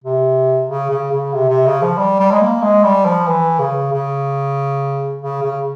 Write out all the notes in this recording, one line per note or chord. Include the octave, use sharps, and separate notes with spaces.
C3
C#3
C#3
C#3
C3
C3
C#3
F3
G3
G3
G#3
A#3
G#3
G3
F3
E3
C#3
C#3
C#3
C#3